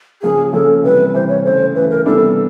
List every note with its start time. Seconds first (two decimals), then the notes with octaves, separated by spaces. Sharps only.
0.22 C#3 F3 A#3 C#4 G#4
0.53 C#3 F3 A#3 C#4 A4
0.83 C3 E3 G3 B4
1.14 C3 E3 G3 C5
1.29 C#5
1.44 C#3 E3 A3 C5
1.74 C#3 E3 A3 B4
1.91 A#4
2.05 C3 E3 G3 B3 D4 A4